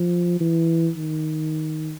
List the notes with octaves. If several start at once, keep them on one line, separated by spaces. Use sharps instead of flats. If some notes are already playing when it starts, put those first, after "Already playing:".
Already playing: F3
E3
D#3